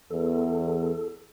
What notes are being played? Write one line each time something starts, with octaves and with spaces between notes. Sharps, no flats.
E2 A4